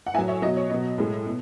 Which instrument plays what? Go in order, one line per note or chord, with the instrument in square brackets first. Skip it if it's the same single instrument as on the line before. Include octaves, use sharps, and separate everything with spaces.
[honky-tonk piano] F#5
A2 E5 G#5
F#3
C#5 E5
B2 F#3 D#5
C#5
B2 F#3 D#5
A2 G#3
B2